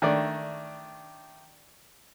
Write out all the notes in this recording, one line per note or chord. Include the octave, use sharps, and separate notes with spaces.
D#3 A3 D4 D5